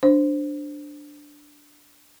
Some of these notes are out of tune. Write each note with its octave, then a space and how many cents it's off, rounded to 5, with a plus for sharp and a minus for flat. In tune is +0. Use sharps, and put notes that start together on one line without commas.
D4 +0 C5 +0